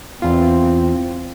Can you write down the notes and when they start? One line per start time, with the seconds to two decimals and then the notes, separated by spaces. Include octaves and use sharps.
0.22 E2 C4 F4